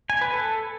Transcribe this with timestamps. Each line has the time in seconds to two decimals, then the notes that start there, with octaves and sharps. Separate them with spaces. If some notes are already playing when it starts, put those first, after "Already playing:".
0.10 G#5
0.21 B4
0.33 A4